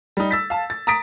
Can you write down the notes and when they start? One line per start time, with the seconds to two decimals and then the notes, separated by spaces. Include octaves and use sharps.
0.17 G3 D#4
0.31 E6 A6 B6
0.50 F5 A5
0.70 A6
0.87 A#5 D#6 A6 B6 D7